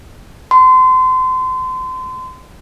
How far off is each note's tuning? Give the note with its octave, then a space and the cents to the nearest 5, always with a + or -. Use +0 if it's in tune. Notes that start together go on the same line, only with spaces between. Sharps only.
C6 -30